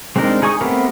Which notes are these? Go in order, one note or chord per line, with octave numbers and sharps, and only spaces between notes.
G#3 C4 D4 D#4 A#4
D#4 G#4 G#5 C#6 D#6
A3 B3 C4 G4 A#4